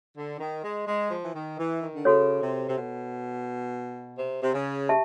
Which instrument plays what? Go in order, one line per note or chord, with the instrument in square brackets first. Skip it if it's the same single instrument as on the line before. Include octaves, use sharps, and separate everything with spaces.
[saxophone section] D3
D#3
G#3
G#3
F3
E3
D#3
E3
D#3
D3
[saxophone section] C#3 [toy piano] F#4 A4 C#5
[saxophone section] C3
C3
B2
C3
C3
C#3
[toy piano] G4 E5 A5